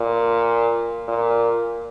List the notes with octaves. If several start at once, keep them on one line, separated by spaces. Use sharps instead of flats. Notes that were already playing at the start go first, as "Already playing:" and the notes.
Already playing: A#2
A#2